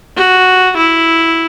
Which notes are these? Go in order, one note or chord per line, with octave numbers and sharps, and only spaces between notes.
F#4
E4